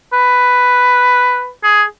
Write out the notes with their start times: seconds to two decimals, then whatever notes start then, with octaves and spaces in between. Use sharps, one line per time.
0.13 B4
1.63 G#4